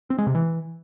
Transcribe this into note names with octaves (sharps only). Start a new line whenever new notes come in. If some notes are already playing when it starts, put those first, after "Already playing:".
C4
G#3
C3
E3